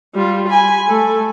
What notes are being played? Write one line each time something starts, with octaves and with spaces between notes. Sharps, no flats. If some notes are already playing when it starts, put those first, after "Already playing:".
G3 F4
G#5 B5
A3 A4